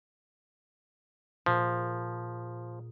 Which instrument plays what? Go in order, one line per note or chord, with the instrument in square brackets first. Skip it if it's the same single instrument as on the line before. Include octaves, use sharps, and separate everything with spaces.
[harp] A#2 G#4 [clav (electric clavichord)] F3